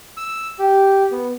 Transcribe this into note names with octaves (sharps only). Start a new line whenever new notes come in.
E6
G4
B3